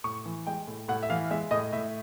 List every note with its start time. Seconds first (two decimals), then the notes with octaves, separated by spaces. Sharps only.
0.04 A2 C#6
0.25 E3
0.47 G#3 G5
0.67 A2
0.88 A2 F#5
1.03 E5
1.10 E3 F5
1.31 G#3 E5
1.51 A2 D#5
1.72 A2 E5